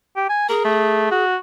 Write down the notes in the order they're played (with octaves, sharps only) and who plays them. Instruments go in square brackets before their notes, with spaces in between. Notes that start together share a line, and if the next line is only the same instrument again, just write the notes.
[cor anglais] G4
G#5
[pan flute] G#4 [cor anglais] A#4
[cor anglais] A3
F#4